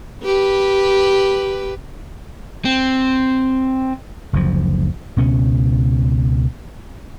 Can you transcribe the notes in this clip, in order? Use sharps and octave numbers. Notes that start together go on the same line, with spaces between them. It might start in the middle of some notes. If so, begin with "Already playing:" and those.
G4 B4
C4
F#1 D2 F3
C#2 B2 C#4